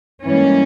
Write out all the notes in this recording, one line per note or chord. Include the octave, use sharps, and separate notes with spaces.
G#2 E3 G3 A#3 C#4